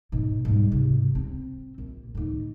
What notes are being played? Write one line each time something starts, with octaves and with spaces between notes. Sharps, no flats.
G#2 B2
G#2 G3
G#2 C3
C4
A#1
A2 D#3